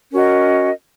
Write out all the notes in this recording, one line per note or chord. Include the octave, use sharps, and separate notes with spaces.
C#4 F#4 A#4 D#5